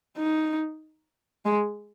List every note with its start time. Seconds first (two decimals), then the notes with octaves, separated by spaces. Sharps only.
0.17 D#4
1.45 G#3